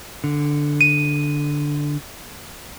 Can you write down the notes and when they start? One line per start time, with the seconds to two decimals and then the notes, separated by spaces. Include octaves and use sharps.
0.24 D3
0.81 D#7